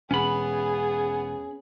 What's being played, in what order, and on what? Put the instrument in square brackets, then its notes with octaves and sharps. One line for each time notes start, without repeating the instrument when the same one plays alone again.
[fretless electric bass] E1 [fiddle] B3 [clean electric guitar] C#4 B5 [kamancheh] G#4